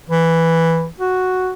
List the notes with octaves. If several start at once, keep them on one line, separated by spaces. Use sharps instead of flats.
E3
F#4